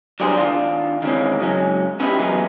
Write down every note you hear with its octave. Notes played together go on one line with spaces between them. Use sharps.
F#3 G3 D4 G#4 A#4 C5
D#3 D4 F4
D#3 E3 G#3 A#3 C4 C#4
C#3 F#3 G#3 C#4
B3 C#4 D#4 E4 F#4 G4
E3 F#3 G#3 A#3 B3